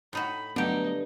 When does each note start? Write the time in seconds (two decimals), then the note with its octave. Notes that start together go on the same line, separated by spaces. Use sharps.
0.13 A2 D#4 F#4 B5
0.56 G2 D3 F#3 A3 B3 D#4 G4